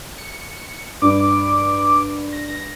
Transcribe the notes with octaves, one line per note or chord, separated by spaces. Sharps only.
C#7
G2 D6
A#6